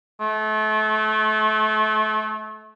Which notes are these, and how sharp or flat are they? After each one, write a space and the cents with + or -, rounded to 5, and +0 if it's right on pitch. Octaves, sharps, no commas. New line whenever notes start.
A3 -30